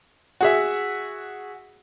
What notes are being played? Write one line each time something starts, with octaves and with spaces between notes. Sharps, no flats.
F#4 G#4 E5